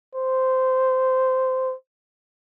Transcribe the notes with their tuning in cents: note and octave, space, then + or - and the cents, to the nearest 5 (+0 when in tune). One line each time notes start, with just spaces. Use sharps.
C5 -15